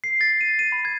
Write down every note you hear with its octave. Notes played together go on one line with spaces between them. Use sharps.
C7
A6
D#7
D#7
B5
G#6